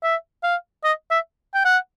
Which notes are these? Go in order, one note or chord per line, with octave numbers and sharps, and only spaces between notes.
E5
F5
D#5
E5
G5
F#5